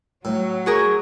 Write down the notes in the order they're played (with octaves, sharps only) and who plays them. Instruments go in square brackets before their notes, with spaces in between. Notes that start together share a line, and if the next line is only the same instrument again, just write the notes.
[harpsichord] A2 [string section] F#3
[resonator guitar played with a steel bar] F#4 G#4 A#4